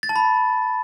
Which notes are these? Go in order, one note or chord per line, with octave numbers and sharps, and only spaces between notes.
A6
A5
B5